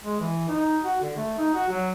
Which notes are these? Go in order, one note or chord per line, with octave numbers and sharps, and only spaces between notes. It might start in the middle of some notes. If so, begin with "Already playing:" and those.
G#3
E3
D#4
F#4
D3
A3
D#4
F#4
F#3